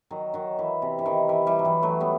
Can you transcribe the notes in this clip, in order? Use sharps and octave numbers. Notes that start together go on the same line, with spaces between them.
D#3 F#3
D#3 F#3
E3
C3
E3
D#3
E3
E3 G3
F#3
E3 G3
F#3 A3
G3 B3